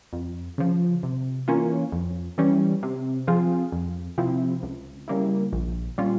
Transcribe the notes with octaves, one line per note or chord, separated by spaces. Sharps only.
F2
C#3 F3
C3
E3 A#3 C#4 F4
F2
E3 G3 C#4
C3
F3 C4 F4 G#4
F2
C3 F3 C4 E4
C#2
C#3 G3 A#3 E4
A#1
A#2 G3 C#4 F4